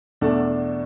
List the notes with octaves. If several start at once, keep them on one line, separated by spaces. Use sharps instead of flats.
E2 B2 A3 D4 A4